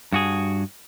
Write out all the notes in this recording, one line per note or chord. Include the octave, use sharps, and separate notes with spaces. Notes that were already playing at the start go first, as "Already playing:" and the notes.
G2 F#4 G#4